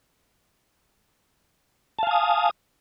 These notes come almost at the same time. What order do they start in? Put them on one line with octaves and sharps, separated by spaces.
A5 F5 G#5 D#6